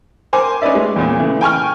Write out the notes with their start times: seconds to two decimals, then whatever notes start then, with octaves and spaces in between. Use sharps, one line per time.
0.33 A#4 C5 G#5 D6
0.62 C#4 D#4 B4 D5 E5
0.75 G#3
0.96 E2 A#2
1.19 C#3 E3 A3
1.41 G5 G#5 C#6 F6